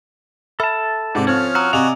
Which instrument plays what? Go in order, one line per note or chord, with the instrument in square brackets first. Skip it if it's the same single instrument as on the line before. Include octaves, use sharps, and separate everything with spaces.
[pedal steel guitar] A4 A5 [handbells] E5 B5 F6
[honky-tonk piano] G#2 C3 [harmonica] D5
[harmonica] F3 C#4 F6 [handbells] C4 C5 [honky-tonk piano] G#6
[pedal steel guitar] F#4 [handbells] A#5 D#6 E6
[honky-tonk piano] C3 F7 [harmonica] D5 D#5 G#5 [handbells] F5 A#5